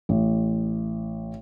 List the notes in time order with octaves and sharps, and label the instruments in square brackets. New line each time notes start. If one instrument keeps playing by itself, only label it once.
[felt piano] A1